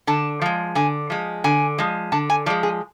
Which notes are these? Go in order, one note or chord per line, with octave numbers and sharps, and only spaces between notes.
D3 A5
F3 G#3
D3 G#5
F3 G#3
D3 G#5
F3 G#3
D3 A5
G#5
F3 G#3 D5
G#4